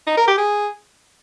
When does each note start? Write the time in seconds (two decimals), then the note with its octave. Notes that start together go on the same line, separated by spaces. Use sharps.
0.07 D#4
0.17 A#4
0.27 G4
0.38 G#4